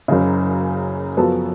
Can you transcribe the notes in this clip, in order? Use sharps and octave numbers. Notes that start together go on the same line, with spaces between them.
F#1 F#2 C#3
F#2 F3 B3 F#4 A4